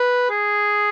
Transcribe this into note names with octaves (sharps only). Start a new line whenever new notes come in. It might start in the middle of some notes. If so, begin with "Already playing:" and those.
Already playing: B4
G#4